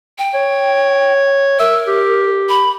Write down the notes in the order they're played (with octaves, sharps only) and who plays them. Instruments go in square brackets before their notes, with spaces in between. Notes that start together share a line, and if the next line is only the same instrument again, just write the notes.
[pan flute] G5
[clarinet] C#5
[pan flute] A#4 [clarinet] E5
[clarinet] G4
[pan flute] B5